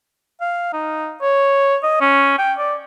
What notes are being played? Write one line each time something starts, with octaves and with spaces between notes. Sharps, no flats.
F5
D#4
C#5
D#5
C#4
G5
D5